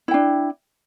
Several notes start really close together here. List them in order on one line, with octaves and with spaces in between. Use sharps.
E4 G5 D4